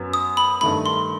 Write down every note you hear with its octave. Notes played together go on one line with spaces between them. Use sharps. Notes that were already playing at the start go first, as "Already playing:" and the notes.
Already playing: F#2 F#3 B3
D#6
B5
G2 D#3 A3 B5
C6